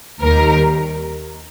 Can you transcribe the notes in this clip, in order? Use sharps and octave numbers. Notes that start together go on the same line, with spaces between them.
D#2 D#3 G3 A#4